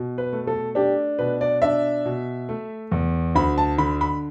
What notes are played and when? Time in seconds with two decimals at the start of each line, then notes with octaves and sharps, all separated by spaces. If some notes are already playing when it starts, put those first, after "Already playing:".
Already playing: B2
0.18 B4
0.33 A3
0.47 A4
0.75 D4 G4
1.19 B2 B4
1.41 D5
1.62 D4 E5
2.05 B2
2.49 A3
2.92 E2
3.35 D2 B5
3.58 A5
3.78 D3 B5
4.01 B5